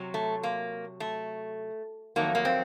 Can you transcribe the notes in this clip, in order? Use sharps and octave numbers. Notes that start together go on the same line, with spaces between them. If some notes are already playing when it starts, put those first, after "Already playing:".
Already playing: C3 F#3
A3
A#3
A3
F2 D#3 F#3 A3 A#3
A#3
C4